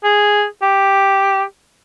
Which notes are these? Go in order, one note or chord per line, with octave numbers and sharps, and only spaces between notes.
G#4
G4